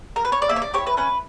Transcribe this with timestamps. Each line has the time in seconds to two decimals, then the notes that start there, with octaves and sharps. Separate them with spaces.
0.16 A#4
0.25 B4
0.32 C#5
0.42 D5
0.49 A#3 E5
0.56 C#5
0.62 D5
0.74 E4 G4 C#5
0.86 B4
0.97 C#4 B4